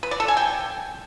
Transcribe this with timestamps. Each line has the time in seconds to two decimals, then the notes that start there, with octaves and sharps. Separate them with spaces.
0.03 B4
0.11 D5
0.20 A4
0.28 G#5
0.37 G5